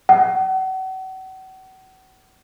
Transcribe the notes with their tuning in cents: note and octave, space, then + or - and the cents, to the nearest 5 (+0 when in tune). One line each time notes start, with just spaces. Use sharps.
F#5 +40